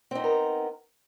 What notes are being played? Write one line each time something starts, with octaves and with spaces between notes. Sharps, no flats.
B3 C4 D#4 A#4